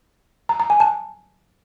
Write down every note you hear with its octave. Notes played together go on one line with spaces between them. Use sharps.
A#5
A#5
G#5
A5